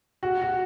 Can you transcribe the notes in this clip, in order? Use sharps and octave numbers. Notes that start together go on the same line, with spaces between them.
F#4
F#4